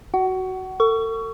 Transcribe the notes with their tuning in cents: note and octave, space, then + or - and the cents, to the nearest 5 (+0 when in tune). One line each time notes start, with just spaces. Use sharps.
F#4 +10 F#5 +30
A4 +40 C#6 +20